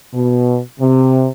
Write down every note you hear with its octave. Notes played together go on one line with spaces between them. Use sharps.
B2
C3